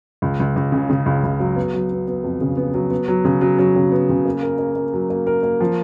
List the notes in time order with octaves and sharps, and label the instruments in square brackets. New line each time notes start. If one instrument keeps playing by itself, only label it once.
[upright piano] C#2
C#2
C#2
C#3
C#3
C#2
C#2
F#3
B3
F#3
B3
B3
F2
C#3
B3
F#3
B3
F#3
C#3
F#3
F#3
C#3
B3
C#3
A#3
A#4
A#3
A#3
F#3
A#3
A#4
A#3
F3